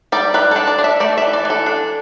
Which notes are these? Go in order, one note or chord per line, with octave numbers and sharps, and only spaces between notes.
G3 D5
G3 B4
D4 A4
D5
D4
E5
A3 D5
E3 E5
D5
E3 A4
D4